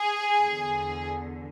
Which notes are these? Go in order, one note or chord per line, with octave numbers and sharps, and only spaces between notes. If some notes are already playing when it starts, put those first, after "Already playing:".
Already playing: G#4
E2 D3